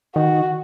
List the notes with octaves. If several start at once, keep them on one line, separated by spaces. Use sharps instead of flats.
D#3 F#4